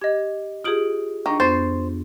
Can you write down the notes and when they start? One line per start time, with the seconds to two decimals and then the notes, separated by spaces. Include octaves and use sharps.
0.02 G4 D#5 G#6
0.64 F4 G4 G#4 D#6 D7 F#7
1.26 D#3 D4 C#6 A#6
1.40 F2 B3 C5 A6 C7